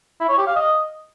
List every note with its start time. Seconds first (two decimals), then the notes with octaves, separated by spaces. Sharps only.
0.20 E4
0.29 C#5
0.38 G4
0.47 F5
0.56 D#5